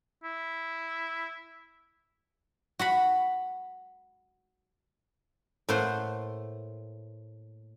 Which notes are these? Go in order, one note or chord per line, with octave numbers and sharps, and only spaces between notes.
E4
F#4 F#5 B5
A2 A3 A#3 C5 F#5 C6